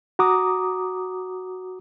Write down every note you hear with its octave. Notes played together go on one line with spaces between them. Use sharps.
F#4 A#5 D6 D#6